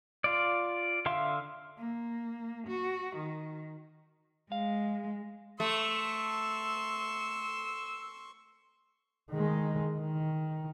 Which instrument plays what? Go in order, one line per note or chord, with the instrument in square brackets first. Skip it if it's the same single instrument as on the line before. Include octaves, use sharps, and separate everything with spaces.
[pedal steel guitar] F4 D5
D3 E5 F5 C6
[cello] A#3
F#4
D#3
[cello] G#3 [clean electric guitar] F5
[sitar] A3 [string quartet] C6 C#6 [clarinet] E6
[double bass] D#3 G#3
D#3